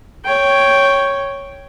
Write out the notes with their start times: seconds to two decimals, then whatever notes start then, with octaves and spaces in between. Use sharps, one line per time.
0.25 C#5 G5